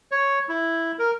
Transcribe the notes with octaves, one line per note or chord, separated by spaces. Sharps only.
C#5
E4
A#4